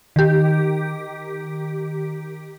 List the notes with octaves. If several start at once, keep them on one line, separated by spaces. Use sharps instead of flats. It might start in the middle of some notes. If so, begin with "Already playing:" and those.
D#3 G4